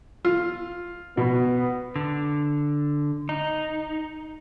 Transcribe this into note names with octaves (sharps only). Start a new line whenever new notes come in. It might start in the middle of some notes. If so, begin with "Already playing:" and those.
F4
B2 B3
D3
D#4